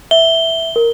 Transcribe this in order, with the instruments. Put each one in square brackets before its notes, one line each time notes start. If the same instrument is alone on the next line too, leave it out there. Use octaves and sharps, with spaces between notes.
[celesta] E5 [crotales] G7
[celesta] A#4